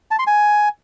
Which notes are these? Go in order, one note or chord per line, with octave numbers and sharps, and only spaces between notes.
A5
C6
G#5